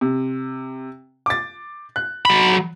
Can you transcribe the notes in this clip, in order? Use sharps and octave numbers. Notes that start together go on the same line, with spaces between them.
C3
D6 A6
F#6
F#3 B5